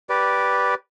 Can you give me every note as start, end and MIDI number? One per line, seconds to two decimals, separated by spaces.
0.09 0.75 67
0.09 0.75 71
0.09 0.75 74